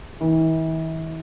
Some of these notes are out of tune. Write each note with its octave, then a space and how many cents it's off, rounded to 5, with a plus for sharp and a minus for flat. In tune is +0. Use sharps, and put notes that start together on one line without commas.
E3 -40